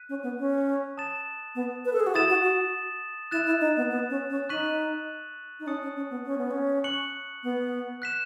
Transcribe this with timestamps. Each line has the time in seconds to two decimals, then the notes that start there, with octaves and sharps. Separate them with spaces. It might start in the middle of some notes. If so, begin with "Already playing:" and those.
Already playing: F#6 B6 D#7
0.09 C#4
0.23 B3
0.39 C#4
0.98 A5 D#6 A6 E7
1.55 B3
1.85 B4
1.93 A4
2.00 G#4
2.07 F#4
2.14 E4 D#6 A6 E7
2.29 F#4
2.44 F#4
3.31 E4 F#6 A6 E7
3.46 E4
3.61 D#4
3.77 B3
3.90 B3
4.10 C#4
4.30 C#4
4.49 D#4 C#6 F#6 B6 D#7 F#7
5.60 D#4
5.67 C#4 A5 D#6 F#6 A6 C#7
5.82 C#4
5.96 C#4
6.10 B3
6.25 C#4
6.38 B3
6.51 C#4
6.84 C#6 F#6 C#7 F#7
7.43 B3
8.02 F#6 B6 E7